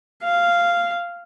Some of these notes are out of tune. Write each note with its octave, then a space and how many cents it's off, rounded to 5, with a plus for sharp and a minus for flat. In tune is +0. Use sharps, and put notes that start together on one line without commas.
F5 -10